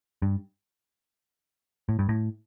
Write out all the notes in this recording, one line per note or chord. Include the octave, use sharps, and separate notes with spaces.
G2
A2
G2
A2